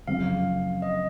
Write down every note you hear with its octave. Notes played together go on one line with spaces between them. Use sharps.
F#1 F2 F3 F5
D#5